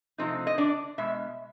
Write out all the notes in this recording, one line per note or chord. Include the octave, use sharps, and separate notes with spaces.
C3 F3 A3 C4 D#4
D#5
D4 D5
B2 G#3 E5